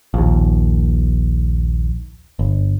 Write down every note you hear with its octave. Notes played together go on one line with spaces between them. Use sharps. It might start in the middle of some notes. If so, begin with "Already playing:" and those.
A#1 D#2
G1